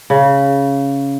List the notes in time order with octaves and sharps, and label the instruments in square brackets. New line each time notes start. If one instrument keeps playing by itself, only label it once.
[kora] C#3